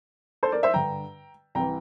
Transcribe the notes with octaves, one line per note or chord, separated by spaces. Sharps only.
A4 C5
A#4 D5
C5 E5
G2 D3 G5 A#5
C2 C3 E3 G5 A#5